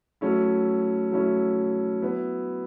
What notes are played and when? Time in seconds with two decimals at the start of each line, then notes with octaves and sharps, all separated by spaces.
0.21 F#3 A3 C#4 E4
1.11 F#3 A3 C#4 E4
2.02 F#3 B3 E4